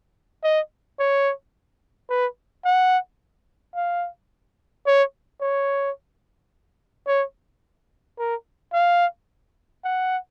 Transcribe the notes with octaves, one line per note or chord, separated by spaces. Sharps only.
D#5
C#5
B4
F#5
F5
C#5
C#5
C#5
A#4
F5
F#5